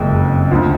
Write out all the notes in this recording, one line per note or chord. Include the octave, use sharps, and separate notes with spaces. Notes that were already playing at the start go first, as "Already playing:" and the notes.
Already playing: F#1 F2 G#3
D2 D3 F3